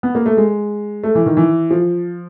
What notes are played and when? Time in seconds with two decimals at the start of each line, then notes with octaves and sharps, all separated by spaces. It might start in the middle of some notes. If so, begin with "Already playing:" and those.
0.03 B3
0.15 A#3
0.26 A3
0.37 G#3
1.03 A3
1.15 E3
1.26 D#3
1.37 E3
1.70 F3